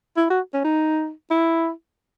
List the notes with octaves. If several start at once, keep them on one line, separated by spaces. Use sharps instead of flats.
E4
F#4
C#4
D#4
E4